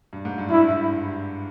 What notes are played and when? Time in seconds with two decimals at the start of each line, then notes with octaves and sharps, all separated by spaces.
0.13 G2
0.25 G#2
0.38 G2
0.50 G2 E4
0.69 G2